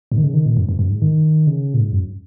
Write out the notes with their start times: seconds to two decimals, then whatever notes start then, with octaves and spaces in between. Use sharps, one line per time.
0.12 G#2
0.18 D#3
0.23 C#3
0.34 D#3
0.46 A#2
0.57 F#2
0.69 F#2
0.79 F#2
0.91 G#2
1.02 D#3
1.47 C#3
1.74 A#2
1.80 G#2
1.92 F#2